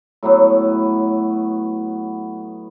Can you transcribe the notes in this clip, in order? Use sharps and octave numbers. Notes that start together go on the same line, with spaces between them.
A2 F#3 B3